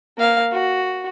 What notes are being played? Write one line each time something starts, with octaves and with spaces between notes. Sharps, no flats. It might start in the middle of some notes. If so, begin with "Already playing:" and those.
A#3 F5
F#4